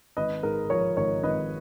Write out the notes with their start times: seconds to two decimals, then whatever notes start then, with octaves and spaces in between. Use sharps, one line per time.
0.17 G#1 B4 D#5
0.43 G#2 A#4
0.70 F3 A#4 C#5
0.97 G#1 A#4 C#5
1.23 G#1 B4 D#5